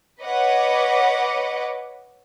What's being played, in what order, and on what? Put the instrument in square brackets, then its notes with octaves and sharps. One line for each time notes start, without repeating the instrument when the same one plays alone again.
[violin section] B4 C#5 D#5 F#5 D6